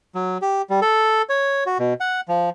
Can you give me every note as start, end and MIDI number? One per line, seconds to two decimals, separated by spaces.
0.15 0.38 54
0.42 0.62 67
0.70 0.80 55
0.82 1.22 69
1.29 1.64 73
1.66 1.78 66
1.79 1.94 47
2.00 2.21 78
2.28 2.50 53